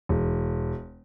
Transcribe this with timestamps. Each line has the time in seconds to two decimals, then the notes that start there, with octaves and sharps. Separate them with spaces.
0.09 E1